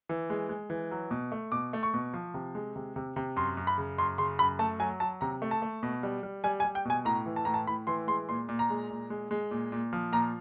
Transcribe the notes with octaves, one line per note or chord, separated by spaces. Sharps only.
E3
G#3
G#3
E3
F#3
B2
A3
B2 D6
A3
C#6
B2
F3
C3
G#3
C3
C3
C3
F#2 C6
F#2
B5
C#3
F#2 C6
C#3 C6
F#2 B5
A3 A5
F#3 G#5
F#3 A5
C3 A#5
A3
A5
A3
B2
G3
G3
G3 G#5
G#5
G3
G5
B2 G#5
A2 A#5
E3
A5
A2 A#5
A5
A2 B5
E3 C6
G#3 C6
A#2 C6
A#2
A#5
G#3
A#2
G#3
G#3
A#2
A#2
F3
A#2 A#5